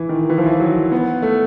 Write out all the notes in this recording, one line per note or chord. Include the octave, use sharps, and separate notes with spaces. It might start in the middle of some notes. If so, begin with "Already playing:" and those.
Already playing: E3
D#3
E3
F3
E3
F#3
B3
A3